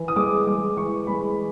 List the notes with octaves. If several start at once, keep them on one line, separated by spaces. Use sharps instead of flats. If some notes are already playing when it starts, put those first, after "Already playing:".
Already playing: E3
D#6
G#3 D6
G#3 D6
E3 C#6
G#3 B5